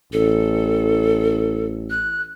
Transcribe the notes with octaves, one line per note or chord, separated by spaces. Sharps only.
A1 A4
F#6